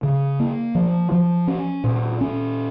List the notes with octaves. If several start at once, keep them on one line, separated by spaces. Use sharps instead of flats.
C#3
A#3
F3
F3
C#4
A#2
C#4